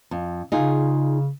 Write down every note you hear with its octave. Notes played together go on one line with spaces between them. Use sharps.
F2
C#3 D#4 F4 G#4